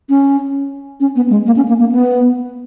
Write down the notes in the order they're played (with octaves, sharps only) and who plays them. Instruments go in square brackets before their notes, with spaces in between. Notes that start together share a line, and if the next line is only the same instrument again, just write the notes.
[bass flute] C#4
C#4
B3
G#3
A#3
C#4
A#3
A#3
B3